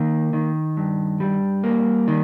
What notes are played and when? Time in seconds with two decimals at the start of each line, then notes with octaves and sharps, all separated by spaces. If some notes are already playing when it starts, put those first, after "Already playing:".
Already playing: D#3 A#3
0.33 D#3
0.77 G2
1.20 G3
1.64 A#3
2.08 D#3